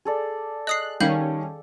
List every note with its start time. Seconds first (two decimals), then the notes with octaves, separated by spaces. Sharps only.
0.05 G#4 A4 D5
0.67 D#5 D#6 F#6 C7
1.00 D#3 G3 C#4 F5 G6 F#7